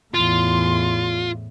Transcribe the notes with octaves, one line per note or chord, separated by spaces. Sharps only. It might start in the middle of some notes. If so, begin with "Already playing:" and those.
E2 A2 F4 C6